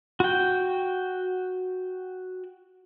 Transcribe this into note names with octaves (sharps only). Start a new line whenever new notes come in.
F#4 G5